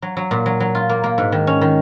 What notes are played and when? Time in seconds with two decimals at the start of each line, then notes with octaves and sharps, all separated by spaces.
0.02 F#3
0.17 F#3
0.31 A#2
0.46 F#3
0.60 F#3
0.75 F4
0.89 A#3
1.04 A#3
1.18 G#2
1.32 D#3
1.47 C#4
1.61 D#3